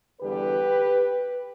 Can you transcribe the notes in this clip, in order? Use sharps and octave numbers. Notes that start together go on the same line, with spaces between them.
E2 D3 G3 G4 B4